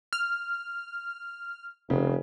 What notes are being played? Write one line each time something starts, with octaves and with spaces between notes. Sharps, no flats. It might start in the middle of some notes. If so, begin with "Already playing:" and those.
F6
F1 C#3